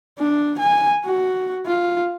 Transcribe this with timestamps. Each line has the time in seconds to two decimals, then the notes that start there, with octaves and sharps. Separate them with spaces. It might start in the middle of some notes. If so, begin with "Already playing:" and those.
0.19 D4
0.59 G#5
1.05 F#4
1.66 F4